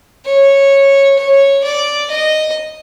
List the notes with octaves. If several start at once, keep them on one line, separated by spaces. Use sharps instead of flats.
C#5
C#5
D5
D#5